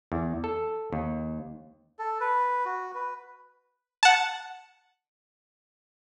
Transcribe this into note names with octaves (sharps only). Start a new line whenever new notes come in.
E2
A4
D#2
A4
B4
F#4
B4
F#5 A5